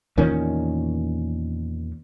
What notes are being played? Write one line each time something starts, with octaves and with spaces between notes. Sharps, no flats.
E2 A#2 D#3 C#4